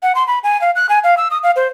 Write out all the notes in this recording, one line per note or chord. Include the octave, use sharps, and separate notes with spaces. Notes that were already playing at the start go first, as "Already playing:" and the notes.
F#5
C6
B5
G#5
F5
F#6
G#5
F5
E6
D#6
F5
C5